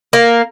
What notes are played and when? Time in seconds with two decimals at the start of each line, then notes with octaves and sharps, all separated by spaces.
0.13 A#3